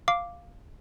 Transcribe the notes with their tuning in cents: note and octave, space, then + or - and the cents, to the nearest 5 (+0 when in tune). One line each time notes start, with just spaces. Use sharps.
F5 +0 D6 +0